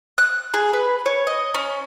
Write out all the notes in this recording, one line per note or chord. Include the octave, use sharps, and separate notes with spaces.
F#6
G#4
B4
C#5
D#5
C#4